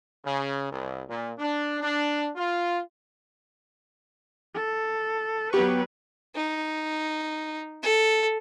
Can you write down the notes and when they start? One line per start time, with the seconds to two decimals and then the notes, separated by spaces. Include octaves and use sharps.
0.24 C#3
0.70 C2
1.08 A#2
1.39 D4
1.81 D4
2.35 F4
4.54 A4
5.53 F#3 B3 G4 B4 C#6
6.36 D#4
7.83 A4